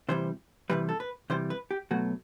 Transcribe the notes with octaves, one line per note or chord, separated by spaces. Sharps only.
C3 E3 G3 C5
C3 E3 G3 B4
A4
B4
C3 E3 G3 C5
B4
G4
B2 F#3 A3 F#4